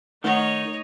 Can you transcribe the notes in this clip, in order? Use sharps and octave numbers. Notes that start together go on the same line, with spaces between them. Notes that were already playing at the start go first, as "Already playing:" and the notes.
D#3 A3 D#4 C#5 F#5